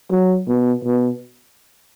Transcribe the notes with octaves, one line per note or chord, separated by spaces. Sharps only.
F#3
B2
B2